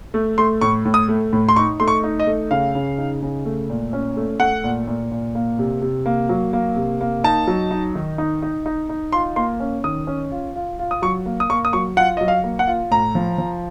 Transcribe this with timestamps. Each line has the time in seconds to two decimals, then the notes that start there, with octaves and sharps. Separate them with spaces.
0.14 A3
0.38 A3 C6
0.61 A2 C#6
0.85 A2
0.94 D#6
1.08 A3
1.33 A2
1.49 C6
1.56 D#4 C#6
1.80 A3 C6
1.88 C#6
2.04 D#4
2.20 D#5
2.27 A3
2.51 C#3 F5
2.75 C#3
2.98 D#4
3.22 C#3
3.45 A3
3.70 A#2
3.93 C#4
4.17 A3
4.40 A3 F#5
4.64 A#2
4.87 A#2
5.11 A#2
5.35 A#3
5.59 C3
5.82 C3
6.06 A#3
6.29 F#3
6.53 A#3
6.76 C3
7.01 A#3
7.24 D#4 A5
7.47 F#3
7.71 D#4
7.95 D#3
8.18 D#4
8.42 D#4
8.66 D#4
8.89 D#4
9.12 F4 C6
9.36 A#3 C6
9.60 C#4
9.84 D#3 D#6
10.07 C#4
10.31 F4
10.56 F4
10.79 F4
10.91 D#6
11.02 F#3 C#6
11.26 A#3
11.40 D#6
11.50 A#3 C#6
11.65 D#6
11.73 F#3 C#6
11.97 F4 F#5
12.17 F#3 D#5
12.28 F5
12.44 A#3
12.59 F#5
12.67 F4
12.91 A2 A#5
13.15 F3
13.38 F3